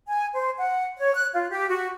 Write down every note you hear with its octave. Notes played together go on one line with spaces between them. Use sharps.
G#5
C5
F#5
C#5
F#6
F4
G4
F#4